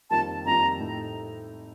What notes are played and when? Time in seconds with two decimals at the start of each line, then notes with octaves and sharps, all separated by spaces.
0.10 F2 D#3 G3 A#3 F4 A5
0.45 F2 D#3 G3 A#3 F4 A#5
0.79 A2 A3 D#4